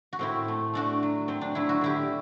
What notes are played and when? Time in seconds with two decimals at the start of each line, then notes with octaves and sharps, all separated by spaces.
0.13 F#4
0.19 A2 C4 E4
0.48 A3
0.74 A3 D4 F#4
1.03 F#3
1.28 F#3 C4
1.41 D4
1.55 F#3 E4
1.69 F#4
1.81 D3 E4 G4